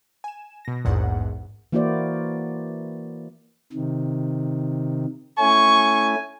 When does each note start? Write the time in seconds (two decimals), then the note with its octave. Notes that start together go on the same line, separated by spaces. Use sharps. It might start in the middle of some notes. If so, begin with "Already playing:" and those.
0.24 G#5 E7
0.65 B2 A#6
0.85 A#1 E2 G#2 F#5
1.72 E3 A#3 E4 F#4 C5 D5
3.73 C3 D#3
5.40 A3 C#4 E4 G#5 C#6